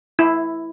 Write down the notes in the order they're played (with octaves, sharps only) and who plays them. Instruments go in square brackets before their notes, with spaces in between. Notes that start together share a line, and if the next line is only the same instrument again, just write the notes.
[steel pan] E4